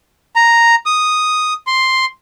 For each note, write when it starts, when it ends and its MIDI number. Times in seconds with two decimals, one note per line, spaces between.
0.36 0.75 82
0.86 1.53 87
1.67 2.05 84